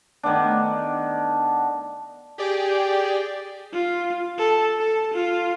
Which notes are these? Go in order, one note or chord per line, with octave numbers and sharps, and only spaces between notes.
D#3 A3 B3 D4
G4 G#4 D5 G5
F4
A4
A4
F4